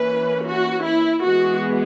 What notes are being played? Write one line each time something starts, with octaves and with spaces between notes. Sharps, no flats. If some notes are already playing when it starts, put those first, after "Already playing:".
Already playing: E3 A#3 C#4 B4
F#4
E4
E3 G#3 B3 F#4